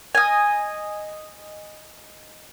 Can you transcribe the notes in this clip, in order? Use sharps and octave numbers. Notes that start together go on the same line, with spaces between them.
D#5 G#5